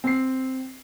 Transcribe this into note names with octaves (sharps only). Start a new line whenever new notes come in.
C4 C7